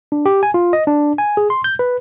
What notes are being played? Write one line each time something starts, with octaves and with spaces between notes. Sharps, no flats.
D4
G4
G#5
F4
D#5
D4
G#5
G#4
C6
G6
B4